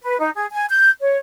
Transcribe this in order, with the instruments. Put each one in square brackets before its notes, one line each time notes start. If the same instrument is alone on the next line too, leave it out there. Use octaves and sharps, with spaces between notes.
[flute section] B4
D#4
G#4
G#5
G6
C#5